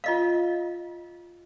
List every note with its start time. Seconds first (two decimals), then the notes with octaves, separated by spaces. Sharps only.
0.04 F4 D#5 F5